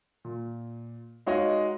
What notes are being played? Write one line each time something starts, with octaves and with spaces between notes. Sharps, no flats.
A#2
G#3 D#4 F#4 C#5 D#5 F5